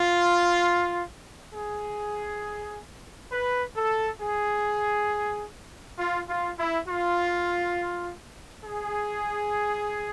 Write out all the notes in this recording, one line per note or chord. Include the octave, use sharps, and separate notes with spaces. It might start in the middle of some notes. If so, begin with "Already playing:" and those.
Already playing: F4
G#4
B4
A4
G#4
F4
F4
E4
F4
G#4